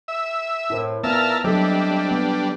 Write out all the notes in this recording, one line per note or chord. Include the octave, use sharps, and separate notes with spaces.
E5
A2 E4 A#4 C5
A#2 B3 A#4 E5 A5 F6
F#3 G3 C4 D4 A4 D#5 E5
B3